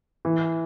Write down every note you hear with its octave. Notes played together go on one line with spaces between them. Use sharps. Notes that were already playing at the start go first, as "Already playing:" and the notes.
E3